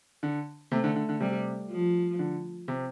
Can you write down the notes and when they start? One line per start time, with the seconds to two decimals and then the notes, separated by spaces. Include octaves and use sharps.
0.23 D3
0.72 C3 A3
0.84 D3
0.96 D3
1.09 D3
1.20 C3 G3
1.70 F3
2.19 D3
2.68 C3